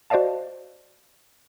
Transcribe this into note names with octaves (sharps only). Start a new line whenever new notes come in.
F#4 C5 D5 D#5 F5 A5